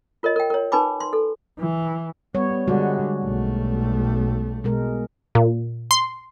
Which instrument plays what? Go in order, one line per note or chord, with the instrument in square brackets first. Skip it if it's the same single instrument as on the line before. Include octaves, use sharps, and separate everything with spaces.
[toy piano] F4 A#4 C#5 D#5
A#4 G5
A#4 C#5
D#4 B4 G#5 B5 D6
C6
A4
[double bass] E3
[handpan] G3 C#5 [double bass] B3
[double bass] D3 [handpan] G3 G#3 F#4
[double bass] B1 A3
[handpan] B2 G#3 A#4
[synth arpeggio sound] A#2
C6